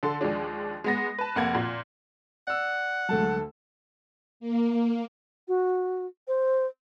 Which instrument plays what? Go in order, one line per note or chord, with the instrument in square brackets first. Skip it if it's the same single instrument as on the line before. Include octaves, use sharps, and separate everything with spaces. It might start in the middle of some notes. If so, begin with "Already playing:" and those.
[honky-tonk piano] D3 A4 C6
D#2 F3 G#3 D4
G#3 B3 A#6
B4 A5
F1 A#3 F#5 G#6
A#2
[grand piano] D5 E6 [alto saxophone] F#5
[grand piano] D2 A4 A5 [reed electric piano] F#3 G#3 A3
[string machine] A#3
[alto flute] F#4
C5